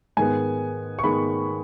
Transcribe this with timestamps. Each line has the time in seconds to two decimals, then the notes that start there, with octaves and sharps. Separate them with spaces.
0.17 G#2 D#3 G#3 B3 G#5
0.99 C#6
1.04 G#2 D#3 G#3 B3 B5